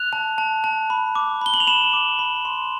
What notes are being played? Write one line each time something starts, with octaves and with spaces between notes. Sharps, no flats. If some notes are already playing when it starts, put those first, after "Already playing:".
Already playing: F#6 F7
A5
A5
A5
B5
D6
B5 G7
F#7
F7
B5 E7
D6
B5
C6